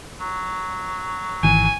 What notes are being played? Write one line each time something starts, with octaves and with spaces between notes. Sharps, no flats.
F#3
G#1 D#3 E3 G#5